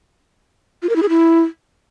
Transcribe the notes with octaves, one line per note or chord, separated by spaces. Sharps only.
F4
A#4
E4
G#4
E4